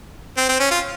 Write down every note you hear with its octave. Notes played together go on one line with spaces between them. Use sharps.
C4
C4
C#4
F4